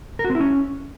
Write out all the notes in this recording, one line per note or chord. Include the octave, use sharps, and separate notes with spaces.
A#4
F#4
C4
E4
C#4